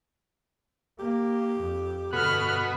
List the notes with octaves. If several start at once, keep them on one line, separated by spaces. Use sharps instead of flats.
A#3 G4
F2
G2 B2 D3 F#4 A4 B5 F6 F#6